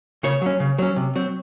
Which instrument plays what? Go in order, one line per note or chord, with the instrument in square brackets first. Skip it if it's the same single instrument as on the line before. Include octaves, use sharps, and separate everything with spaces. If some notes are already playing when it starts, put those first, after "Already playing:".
[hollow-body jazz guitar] C#3 C#5
F#3 C#4
C#3
F#3 C#4
C3
F#3 C4